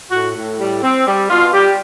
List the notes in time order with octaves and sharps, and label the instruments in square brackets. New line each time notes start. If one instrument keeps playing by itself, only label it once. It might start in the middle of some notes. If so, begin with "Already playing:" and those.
[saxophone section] A2 F#4
A2
G3
C4
G3
B2 F4
G3 G4